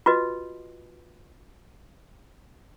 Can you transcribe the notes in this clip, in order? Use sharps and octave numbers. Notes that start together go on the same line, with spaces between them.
F4 F#4 B4 D#5